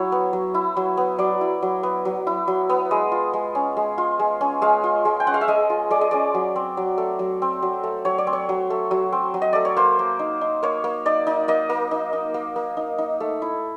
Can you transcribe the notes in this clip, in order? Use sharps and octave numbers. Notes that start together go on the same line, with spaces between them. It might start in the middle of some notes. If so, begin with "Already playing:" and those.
Already playing: F#3 E4 C#5
B3
F#3
E4
F#3
B3
F#3 D5
E4
F#3
B3
F#3
E4
F#3
B3
G#3 D#5
F4
G#3
C#4
G#3
F4
G#3
C#4
G#3 F5
F4
G#3
G5
C#4 F#5
F5
E5
G#3 D#5
F4
G#3 D5
D#5
C#4 D5
F#3
C4
F#3
A3
F#3
C4
F#3
A3
F#3 C#5
D5
C4
C#5
F#3
A3
F#3
C4
F#3
D#5
A3 D5
C#5
A#3 C5
A#3
D#4
D#4
A#3 C#5
A#3
D#4 D5
D#4
A#3 D#5
A#3
D#4
D#4
A#3
A#3
D#4
D#4
A3
E4